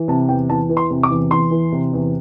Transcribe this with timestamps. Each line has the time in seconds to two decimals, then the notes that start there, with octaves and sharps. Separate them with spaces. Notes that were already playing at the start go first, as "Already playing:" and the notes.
Already playing: E3
0.08 C3 A5
0.29 E2 G5
0.49 E2 A5
0.69 E3
0.77 C6
0.90 C3
1.03 D6
1.10 E2
1.31 E2 C6
1.51 E3
1.72 C3
1.93 E2